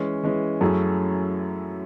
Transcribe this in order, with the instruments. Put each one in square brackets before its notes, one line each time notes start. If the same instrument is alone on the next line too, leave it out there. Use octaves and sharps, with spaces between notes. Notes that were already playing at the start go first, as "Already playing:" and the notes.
Already playing: [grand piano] E3 G#3 C#4
E3 G#3 C#4
[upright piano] F#2 [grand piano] F#3 A3 C#4 E4 G#4